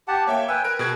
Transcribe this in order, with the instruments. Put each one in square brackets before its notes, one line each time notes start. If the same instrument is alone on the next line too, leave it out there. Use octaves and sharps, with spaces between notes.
[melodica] G4 F#5 A5
[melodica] A#3 [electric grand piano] C#5 E5 G5
[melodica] B4 G5 G#5 [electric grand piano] E6
[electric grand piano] A#4 D7 [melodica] B4
[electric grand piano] B2 G#4 G#6